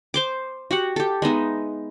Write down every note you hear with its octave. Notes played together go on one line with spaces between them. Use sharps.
C5 C6 D6
F#4 G4 F#5
G4 A4
G#3 B3 D#4 E5